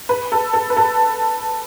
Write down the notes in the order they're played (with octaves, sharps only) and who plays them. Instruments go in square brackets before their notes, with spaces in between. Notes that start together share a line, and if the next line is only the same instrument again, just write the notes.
[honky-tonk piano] B4
A4
A4
B4
A4